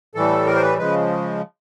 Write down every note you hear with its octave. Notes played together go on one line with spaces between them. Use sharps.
A2 E3 G3 A4
A#4
C5
B4
C#3 F3 G#3 B4